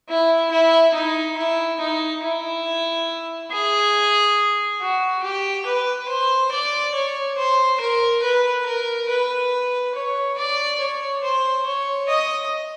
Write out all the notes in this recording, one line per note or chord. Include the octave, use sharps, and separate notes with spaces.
E4
E4
D#4
E4
D#4
E4
G#4
F#4
G4
B4
C5
D5
C#5
C5
A#4
B4
A#4
B4
C#5
D5
C#5
C5
C#5
D#5